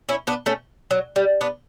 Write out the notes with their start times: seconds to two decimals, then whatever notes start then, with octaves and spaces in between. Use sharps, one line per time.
0.09 C#4 E4
0.27 B3 D4
0.46 A3 C#4
0.91 F#3
1.16 G3
1.41 B3 D4